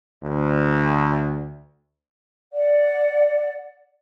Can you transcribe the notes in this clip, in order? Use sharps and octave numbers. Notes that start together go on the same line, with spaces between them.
D2
D5 F#5